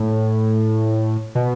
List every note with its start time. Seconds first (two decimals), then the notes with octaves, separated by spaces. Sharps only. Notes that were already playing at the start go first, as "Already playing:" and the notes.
Already playing: A2
1.35 B2